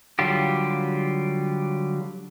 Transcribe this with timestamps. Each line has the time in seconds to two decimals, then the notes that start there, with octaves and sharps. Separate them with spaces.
0.19 D3 F#3 G3 F4 G4